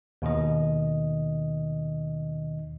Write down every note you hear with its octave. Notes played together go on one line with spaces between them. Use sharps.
D#2 B2 D#3 D#5